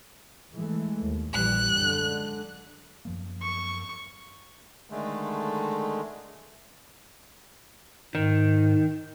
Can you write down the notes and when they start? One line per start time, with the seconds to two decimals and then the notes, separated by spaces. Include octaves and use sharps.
0.55 E3 G#3 A3
1.01 D#2
1.33 A#1 E3 G3 F#6
1.73 F#2 D3 G#3
3.05 F#2 F3 A#3
3.42 C#6
4.90 D3 D#3 G#3 A3
8.15 G#2 D#3